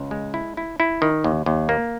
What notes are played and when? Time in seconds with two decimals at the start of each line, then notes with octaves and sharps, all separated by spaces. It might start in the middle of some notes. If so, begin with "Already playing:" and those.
Already playing: C#2
0.11 G#3
0.34 E4
0.57 E4
0.80 E4
1.02 D#3
1.24 D#2
1.46 D#2
1.69 A#3